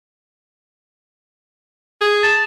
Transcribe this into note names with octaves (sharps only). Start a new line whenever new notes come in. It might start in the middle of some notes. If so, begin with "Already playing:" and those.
G#4
A5